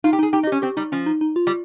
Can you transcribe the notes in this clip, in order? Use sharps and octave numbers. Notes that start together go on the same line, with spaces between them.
D#4 F4
G4
D#4
G#4
D#4 G4
D#4
G4
C#4
C4 G4
G3 D#4
F3 C#4
D#4
D#4
F4
G3